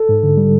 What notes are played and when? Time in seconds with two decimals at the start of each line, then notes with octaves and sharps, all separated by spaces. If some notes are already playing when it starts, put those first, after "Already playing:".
Already playing: A4
0.09 G#2
0.23 D3
0.37 G3